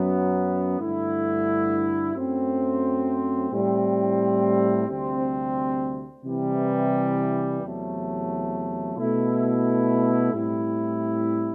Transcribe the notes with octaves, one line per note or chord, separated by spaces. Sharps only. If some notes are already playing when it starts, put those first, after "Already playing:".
Already playing: F#2 F#3 B3
G2 D3 A3 E4
F#2 F#3 A3 C4
A2 G3 C4
D2 C3 G3 C4
C3 E3 G3
E2 C3 F#3 A3
B2 A3 E4
A2 G3 C4 E4